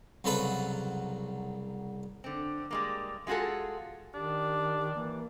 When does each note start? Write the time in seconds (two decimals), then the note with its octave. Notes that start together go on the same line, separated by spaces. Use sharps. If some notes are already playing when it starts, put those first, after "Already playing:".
0.24 C2 C#3 F#3 A4 B4 E5
2.24 D3 C4
2.71 G3 G#3 A#3
3.27 G#3 F4 F#4 G#4 A4
4.14 D#3 D4 G4
4.95 E3 A#3